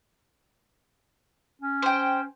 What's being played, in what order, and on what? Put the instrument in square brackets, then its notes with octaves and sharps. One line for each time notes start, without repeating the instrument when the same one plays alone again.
[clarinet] C#4
[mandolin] C5 G5